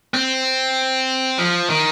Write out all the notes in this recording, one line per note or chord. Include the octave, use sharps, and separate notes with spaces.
C4
F3
D#3